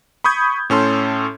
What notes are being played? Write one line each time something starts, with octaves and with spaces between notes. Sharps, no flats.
B5 C#6 D#6 G6 G#6
A2 C#4 A4 C6